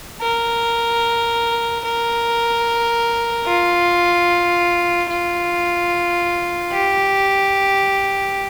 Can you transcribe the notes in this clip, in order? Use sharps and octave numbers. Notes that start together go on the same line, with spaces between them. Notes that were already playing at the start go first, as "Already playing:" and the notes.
A#4
A#4
F4
F4
G4